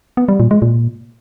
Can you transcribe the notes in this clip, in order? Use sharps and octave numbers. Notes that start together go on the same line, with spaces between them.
B3
G3
A#2
G#3
A#2